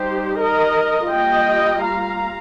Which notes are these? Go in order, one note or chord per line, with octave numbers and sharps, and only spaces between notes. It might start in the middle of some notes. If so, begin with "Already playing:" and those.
Already playing: G3 D#4 G4 C5
A#4 D#5
G3 A#3 F4 D#5 G5
F5 A#5